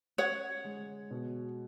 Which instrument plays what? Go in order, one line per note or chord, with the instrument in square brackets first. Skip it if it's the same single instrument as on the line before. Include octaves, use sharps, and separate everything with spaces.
[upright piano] C#4 [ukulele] C#5 F#5
[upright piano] G#3
B2